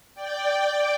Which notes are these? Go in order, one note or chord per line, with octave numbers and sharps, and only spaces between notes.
D5 G5